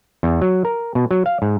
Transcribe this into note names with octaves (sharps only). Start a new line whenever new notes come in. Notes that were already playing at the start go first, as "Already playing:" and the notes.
E2
F#3
A#4
B2
F#3
F5
G#2